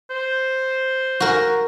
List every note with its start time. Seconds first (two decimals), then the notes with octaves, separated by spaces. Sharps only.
0.10 C5
1.20 F#4 A#4